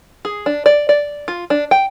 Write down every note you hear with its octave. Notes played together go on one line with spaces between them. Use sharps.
G#4
D4
D5
D5
F4
D4
G5